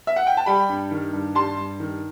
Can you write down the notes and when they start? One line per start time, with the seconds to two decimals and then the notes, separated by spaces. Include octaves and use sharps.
0.07 E5
0.16 F#5
0.27 G5
0.37 A5
0.46 G3 G5 B5
0.69 G2
0.91 D#3
1.13 G2
1.35 G3 A5 C6
1.58 G2
1.80 D#3